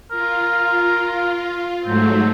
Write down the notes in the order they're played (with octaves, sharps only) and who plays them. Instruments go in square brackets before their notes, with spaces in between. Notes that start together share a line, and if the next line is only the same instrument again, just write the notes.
[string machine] F4 [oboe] A#4
[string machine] G#2 F#3 A3 [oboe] C4